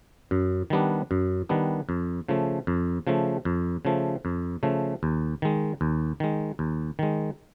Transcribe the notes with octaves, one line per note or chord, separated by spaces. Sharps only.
F#2
D#3 G3 B3 D4
F#2
D#3 G3 B3 D4
F2
C#3 F3 A3
F2
C#3 F3 A3
F2
C#3 F3 A3
F2
C#3 F3 A3
D#2
D#3 G#3
D#2
D#3 G#3
D#2
D#3 G#3